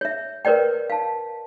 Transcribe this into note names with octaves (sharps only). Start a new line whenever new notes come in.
C#5 E5
A#4 B4 C#5 D5 G5
F5 A5